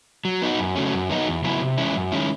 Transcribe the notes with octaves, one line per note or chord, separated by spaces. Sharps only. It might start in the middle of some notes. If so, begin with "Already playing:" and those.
F#3
B3 D#4 F#4
F#2
C#3 F#3 A3 C#4
F#2
D#3 F#3 B3 D#4
E2
C#3 F#3 B3 E4
C3
E3 G#3 C#4 E4
F#2
D#3 G#3 C#4 E4